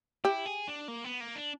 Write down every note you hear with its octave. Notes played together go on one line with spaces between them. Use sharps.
E4 G4
G#4
D4
A#3
B3
A#3
D4